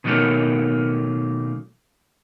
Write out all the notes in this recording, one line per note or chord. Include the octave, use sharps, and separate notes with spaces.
B2 D#3 F#3 A3 A#3 C#4